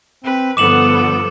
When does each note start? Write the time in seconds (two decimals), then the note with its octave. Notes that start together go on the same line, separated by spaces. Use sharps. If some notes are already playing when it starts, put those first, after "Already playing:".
0.24 C4 B4
0.57 G2 D3 F3 B3 A4 D6 E7 F#7